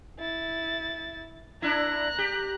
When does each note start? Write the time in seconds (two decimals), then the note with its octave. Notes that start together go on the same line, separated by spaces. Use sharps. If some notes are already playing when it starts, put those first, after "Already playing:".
0.19 E4 A6
1.62 D4 E4 A#5 F#6
2.18 G4